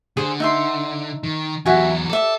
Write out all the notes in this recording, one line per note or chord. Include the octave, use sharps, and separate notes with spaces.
D3 G#4 C5
D#4 E5 C6
D#3
E2 F#3 E4 F#4 G#5
A4 D5 E5